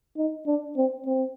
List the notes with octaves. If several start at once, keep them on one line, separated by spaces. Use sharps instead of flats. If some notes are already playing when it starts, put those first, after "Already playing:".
D#4
D4
C4
C4